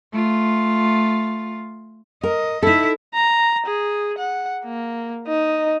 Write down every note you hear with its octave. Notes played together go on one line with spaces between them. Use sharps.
A3 F4
A#4 D#5
D#4 E4 A4 E5
A#5
G#4
F#5
A#3
D#4